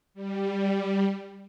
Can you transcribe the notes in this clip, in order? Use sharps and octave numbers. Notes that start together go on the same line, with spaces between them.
G3